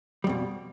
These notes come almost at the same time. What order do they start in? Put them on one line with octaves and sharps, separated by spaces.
G3 F2 B2